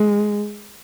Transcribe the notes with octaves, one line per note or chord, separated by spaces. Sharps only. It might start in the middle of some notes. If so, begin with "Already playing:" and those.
Already playing: G#3